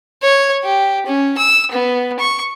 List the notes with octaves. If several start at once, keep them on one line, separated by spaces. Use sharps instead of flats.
C#5
G4
C#4
E6
B3
C#6